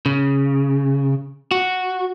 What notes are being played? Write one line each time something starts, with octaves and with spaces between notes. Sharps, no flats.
C#3
F#4